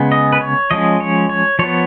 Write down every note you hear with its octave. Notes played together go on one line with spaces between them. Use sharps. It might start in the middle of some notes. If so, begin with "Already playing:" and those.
Already playing: C#3 G#3 B3
D#5
B4
C#5
F3 G#3 C#4 D#5
C#5
C#5
F3 B3 C#5